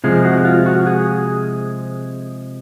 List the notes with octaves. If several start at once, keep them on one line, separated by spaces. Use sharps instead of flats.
C3 F3 G#3 G#4
F#4
F4
F#4
G#4